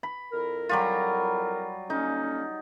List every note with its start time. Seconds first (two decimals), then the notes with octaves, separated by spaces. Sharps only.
0.03 B5
0.32 F2 E4 A#4
0.69 F#3 G3 F4
1.90 D3 A#3 C#4 D#4